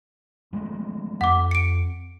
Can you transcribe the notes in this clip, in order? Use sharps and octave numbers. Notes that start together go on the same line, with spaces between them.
F3 G#3 A3
F2 F#5 D6
C#7 D7